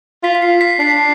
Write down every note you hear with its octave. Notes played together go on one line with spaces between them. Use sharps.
F4 B6
B6
C7
B6
B6
D4 C7